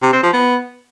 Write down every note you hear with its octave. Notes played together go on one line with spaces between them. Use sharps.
C3
C4
F3
B3